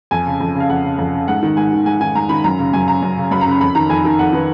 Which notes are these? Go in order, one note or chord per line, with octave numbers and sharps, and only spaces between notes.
F2 G#5
C#3
F2
C#3
F5
F2 F#5
C#3
F2
C#3
G#2 F#5
D#3
G#2 G#5
D#3
G#2 G#5
D#3 G#5
G#2 A#5
D#3 B5
F#2 A#5
C#3
F#2 G#5
C#3 A#5
F#2
C#3
F#2 B5
A#5
C#3 B5
F2 B5
D#3 A#5
F2 G#5
D#3
F2 F#5
D#3 B4